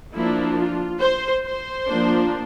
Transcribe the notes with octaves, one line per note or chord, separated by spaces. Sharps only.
F3 A#3 D4 E4
F4
C5
C5
F3 A#3 D4